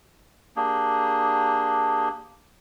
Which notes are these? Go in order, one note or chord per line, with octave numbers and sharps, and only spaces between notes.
A#3 D4 G4 G#4